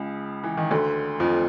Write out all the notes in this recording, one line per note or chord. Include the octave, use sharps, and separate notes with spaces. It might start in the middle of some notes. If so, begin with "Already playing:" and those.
Already playing: C#2 C#3
E3
D#3
D2 D3
F2 F3